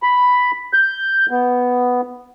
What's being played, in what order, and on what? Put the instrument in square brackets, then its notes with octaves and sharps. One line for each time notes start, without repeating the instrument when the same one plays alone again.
[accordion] B5
G6
B3